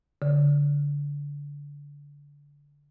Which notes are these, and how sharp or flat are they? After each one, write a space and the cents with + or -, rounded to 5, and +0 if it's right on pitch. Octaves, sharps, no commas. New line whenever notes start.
D3 -25